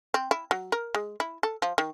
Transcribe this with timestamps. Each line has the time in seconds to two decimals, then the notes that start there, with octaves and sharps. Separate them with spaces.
0.14 C4
0.31 E4
0.51 F#3
0.72 A#4
0.95 G#3
1.20 E4
1.43 A4
1.62 F3
1.78 D#3